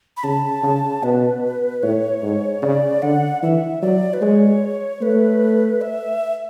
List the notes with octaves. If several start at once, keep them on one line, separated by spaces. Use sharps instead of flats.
B5
C#3 A5
C#3
B2 B4
A2 C#5
G#2
C#3 D5
D3 F#5
E3 E5
F#3 D5
B4
G#3 C#5
A3 B4
E5